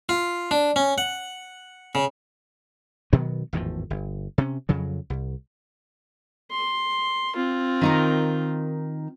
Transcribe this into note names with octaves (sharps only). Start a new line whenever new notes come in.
F4
D4
C#4
F#5
C#3
B2 D#3 F#3 B3
G#1 E2 A2 F3
G1
C3 C#4
F2 C#3 F#3
C2
C6
C4 F4
D#3 D#4 A#4